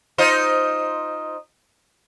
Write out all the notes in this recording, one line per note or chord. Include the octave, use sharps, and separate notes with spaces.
D#4 F4 C5